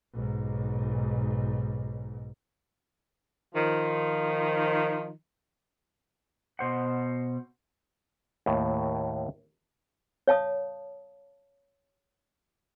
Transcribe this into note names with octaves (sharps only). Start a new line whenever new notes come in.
B1 G#2
D#3 F3
B2 C5 F#5
D#2 A2
C#5 F5 A5 D#6